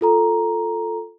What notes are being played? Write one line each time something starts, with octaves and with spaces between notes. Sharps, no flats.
F4 A4 A#5